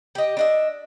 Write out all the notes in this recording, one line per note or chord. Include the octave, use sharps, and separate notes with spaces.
G4 D#5
D4 D#5 E5